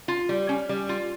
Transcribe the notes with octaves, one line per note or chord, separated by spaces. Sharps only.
F4
G3
C#4
G3
F4